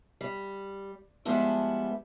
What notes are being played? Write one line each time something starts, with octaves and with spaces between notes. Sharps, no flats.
G3
F3 G3 G#3 B3 D4 E4